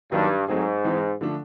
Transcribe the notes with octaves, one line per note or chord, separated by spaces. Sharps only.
G2 D#3 F#3 A#3 D#4 F#4
G#2 F#3 A3 C4 D#4 G#4
E3 G#3 C4 D#4
D3 F3 A3 D4